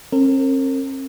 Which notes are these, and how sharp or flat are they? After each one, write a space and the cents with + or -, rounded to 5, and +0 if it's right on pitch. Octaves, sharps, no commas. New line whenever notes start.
C4 +45 A#4 -30